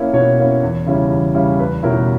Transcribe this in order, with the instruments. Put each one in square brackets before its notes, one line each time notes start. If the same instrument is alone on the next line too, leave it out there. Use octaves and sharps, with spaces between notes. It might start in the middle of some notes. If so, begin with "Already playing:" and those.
Already playing: [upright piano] A#3 C#4 E4
B2 C#5
A#3 C#4 E4
E2
C#3 G3 C#4 E4
E2
C#3 G3 C#4 E4
E2 B4
B2 G3 C#4 E4 A#4